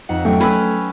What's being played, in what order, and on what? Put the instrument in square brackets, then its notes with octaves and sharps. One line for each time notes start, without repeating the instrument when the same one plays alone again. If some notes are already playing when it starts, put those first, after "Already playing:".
[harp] F2 D#4 F#5
[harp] F#3 G5 C#6 [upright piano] A3
[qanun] C#4 B4 [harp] B5 E6